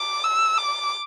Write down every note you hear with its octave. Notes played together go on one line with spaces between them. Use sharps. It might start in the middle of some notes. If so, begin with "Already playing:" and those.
Already playing: D6
E6
D6